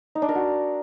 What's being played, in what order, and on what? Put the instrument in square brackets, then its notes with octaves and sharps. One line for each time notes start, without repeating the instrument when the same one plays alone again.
[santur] D#4
D4
A#4
F#4